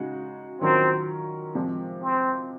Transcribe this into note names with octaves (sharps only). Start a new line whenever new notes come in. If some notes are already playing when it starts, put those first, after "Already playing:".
Already playing: C#3 G#3 D#4 F#4
D#3 F#3 C4 C#4 F4 A#4
C3 F3 G#3
C4